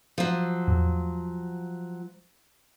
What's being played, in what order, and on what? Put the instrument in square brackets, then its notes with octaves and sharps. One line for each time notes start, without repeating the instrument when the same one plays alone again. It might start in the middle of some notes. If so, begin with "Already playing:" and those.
[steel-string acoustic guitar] F3 F#3
[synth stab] E2 A2